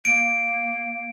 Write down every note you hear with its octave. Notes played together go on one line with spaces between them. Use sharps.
A#3 D7